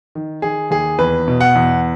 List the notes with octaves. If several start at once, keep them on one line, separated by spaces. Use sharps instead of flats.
D#3
D#3 G#4
D#2 G#4
E2 B4
B2
F#5
E2